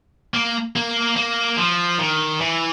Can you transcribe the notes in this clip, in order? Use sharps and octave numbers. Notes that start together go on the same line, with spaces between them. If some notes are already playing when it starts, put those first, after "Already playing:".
A#3
A#3
A#3
F3
D#3
E3